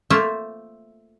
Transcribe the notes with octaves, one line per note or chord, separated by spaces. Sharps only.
A3 A#3 F4 C5 E5 F5